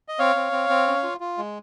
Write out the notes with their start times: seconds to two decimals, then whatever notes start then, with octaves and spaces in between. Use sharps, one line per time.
0.08 D#5
0.19 C4 C#5 F5
0.36 C4
0.52 C4
0.69 C4
0.87 C#4
1.03 F4
1.20 F4
1.38 G#3